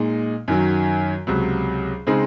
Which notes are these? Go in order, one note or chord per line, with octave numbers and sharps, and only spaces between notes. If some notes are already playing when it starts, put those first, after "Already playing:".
Already playing: A#2 G#3 D#4
F#2 D#3 F#3
C#2 C3 F#3
C#3 G#3 C4 D#4